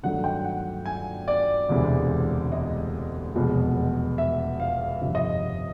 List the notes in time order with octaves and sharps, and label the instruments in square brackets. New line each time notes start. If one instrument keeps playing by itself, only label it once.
[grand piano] G1 G2 D#3 F#3 A3 F#5
G5
F#5
G#5
D5
E1 D2 C3 E3 G#3
D#5
F1 E2 B2 G#3
E5
F5
G1 F2 C3 E5
D#5